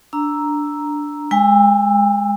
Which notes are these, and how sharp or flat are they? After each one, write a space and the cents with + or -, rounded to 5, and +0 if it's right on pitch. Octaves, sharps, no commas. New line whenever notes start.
D4 +0 A#5 +0 E6 +0
G#3 +0 G5 +45 E6 +0